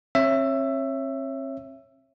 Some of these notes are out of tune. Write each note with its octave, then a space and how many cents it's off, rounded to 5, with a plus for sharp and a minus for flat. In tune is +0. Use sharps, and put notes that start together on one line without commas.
C4 +40 C#5 -15 E5 +15